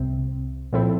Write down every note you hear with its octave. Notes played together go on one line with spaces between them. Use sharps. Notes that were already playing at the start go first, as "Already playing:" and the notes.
Already playing: C2 C3 C4
A#2 F3 C4 E4 A4